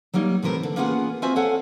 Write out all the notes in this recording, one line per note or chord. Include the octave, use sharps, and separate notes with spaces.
F#3 G3 A#3 D#4
A2 C3 E3 A#4 C5
D3
A#3 B3 C#4 F4 G#4 F#5
C4 F4 F#4 C5 E5 G#5
A4 C#5 F5 F#5 G#5